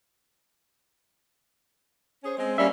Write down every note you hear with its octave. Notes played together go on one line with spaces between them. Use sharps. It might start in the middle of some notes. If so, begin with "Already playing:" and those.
C#4 G#4 C5
G#3 C4
G3 A#3 C#4 E5